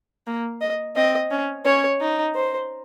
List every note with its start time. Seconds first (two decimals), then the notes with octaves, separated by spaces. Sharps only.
0.27 A#3
0.61 D#5
0.96 C4 D#5
1.31 C#4
1.65 C#4 C#5
2.01 D#4
2.35 C5